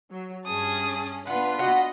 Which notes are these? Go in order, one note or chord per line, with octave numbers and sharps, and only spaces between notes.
F#3
G2 C#4 G#4 A5 D#6
B3 D4 F4 B4 F#5
F#4 D#5 F#5 B5